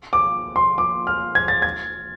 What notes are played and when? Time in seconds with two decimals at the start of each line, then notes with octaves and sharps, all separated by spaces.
0.13 D6
0.56 C6
0.78 D6
1.07 F6
1.35 G#6
1.48 A6
1.62 G#6